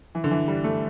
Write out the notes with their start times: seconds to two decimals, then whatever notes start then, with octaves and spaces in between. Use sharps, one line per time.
0.15 E3
0.24 D3
0.31 E3
0.48 G3
0.64 A3